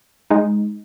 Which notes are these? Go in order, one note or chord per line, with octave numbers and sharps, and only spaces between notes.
G#3 D#4